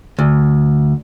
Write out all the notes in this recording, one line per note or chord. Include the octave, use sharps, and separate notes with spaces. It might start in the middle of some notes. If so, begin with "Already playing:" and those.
D2